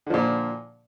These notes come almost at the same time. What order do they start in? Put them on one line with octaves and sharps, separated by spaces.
D3 F3 A#2